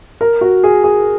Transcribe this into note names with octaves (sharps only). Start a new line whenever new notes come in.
A#4
F#4
G#4
G#4